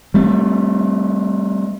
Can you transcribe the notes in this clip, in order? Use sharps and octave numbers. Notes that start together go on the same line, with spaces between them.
G3 A3 C4